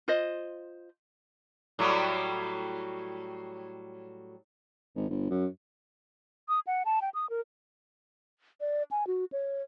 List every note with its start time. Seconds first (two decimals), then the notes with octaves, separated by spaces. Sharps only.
0.08 F4 C5 D#5
1.79 A2 F#3 G3
4.96 G#1
5.09 G1
5.30 F#2
6.49 D#6
6.67 F#5
6.85 A5
7.02 G5
7.14 D#6
7.30 A#4
8.61 D5
8.91 G#5
9.07 F#4
9.32 C#5